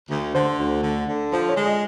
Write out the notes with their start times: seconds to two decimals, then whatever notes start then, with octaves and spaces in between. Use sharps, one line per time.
0.10 D2
0.34 D3 C5
0.58 D2
0.83 D3
1.08 D3
1.33 F3 C5
1.49 C#5
1.57 G#3
1.65 D#5